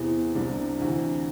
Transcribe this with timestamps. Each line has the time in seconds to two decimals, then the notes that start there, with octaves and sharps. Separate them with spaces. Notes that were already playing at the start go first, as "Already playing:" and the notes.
Already playing: E2 C3 E3 B3
0.35 C2 C3 G3 D4
0.79 D2 C3 E3